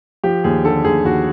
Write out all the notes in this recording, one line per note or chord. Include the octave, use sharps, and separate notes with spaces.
F3 G4
D#2 G#4
D3 A4
D#2 G#4
D#2 F#4